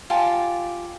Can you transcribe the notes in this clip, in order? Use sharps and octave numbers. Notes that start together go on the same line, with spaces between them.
F4 G4 G#5 A5